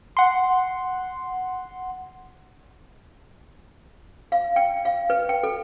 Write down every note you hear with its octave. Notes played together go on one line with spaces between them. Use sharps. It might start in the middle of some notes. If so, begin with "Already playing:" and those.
F#5 C6
F5
G5
F5
B4
G5
A4